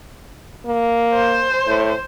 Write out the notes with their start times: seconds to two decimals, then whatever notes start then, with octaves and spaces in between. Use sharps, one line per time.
0.66 A#3
1.14 C5
1.67 A2